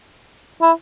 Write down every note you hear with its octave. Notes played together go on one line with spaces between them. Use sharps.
E4